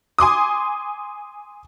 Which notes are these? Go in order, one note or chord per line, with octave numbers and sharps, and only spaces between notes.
G#5 C6 D6 D#6